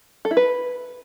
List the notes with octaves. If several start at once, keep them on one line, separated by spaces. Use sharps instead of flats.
A4
E4
B4